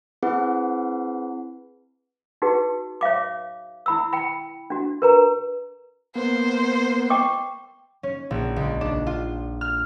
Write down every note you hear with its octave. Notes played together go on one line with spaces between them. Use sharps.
C4 E4 G#4 B4 F#5
D#4 F#4 G#4 B4
C#5 E5 F5 D6
E4 B5 E6
G5 B5
D4 F#4
A#4 B4 A#5
A#3 B3 C5
G5 C#6 D6
C#4
A#1
C#2
D4
F4
F6